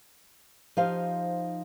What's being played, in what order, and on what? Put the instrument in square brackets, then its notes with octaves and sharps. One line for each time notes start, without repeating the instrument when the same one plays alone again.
[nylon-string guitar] F3 D#4 G4 C5 F5